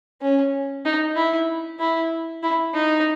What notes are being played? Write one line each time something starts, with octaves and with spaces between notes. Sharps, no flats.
C#4
D#4
E4
E4
E4
D#4